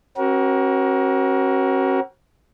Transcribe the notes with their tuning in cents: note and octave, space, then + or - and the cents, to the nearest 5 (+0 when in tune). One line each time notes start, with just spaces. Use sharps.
C#4 -45 F#4 +25 A#4 +30